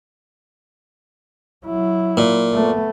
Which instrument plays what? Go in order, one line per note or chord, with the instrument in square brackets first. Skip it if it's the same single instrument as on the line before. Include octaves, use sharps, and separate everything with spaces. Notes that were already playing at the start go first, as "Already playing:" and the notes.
[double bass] F#3 E4
[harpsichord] A#2
[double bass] A3 B3